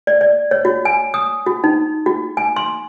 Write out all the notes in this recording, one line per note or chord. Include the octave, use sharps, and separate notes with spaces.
D5
D5
C#5
F#4
G#5
D#6
F#4
D#4
F#4
G#5
C6